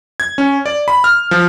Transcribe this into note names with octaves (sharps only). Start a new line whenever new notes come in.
G#6
C#4
D5
B5
F6
F3